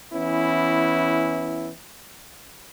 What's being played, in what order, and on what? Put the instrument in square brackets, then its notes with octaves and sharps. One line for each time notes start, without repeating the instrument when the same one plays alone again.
[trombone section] E3 B3 C#4 E4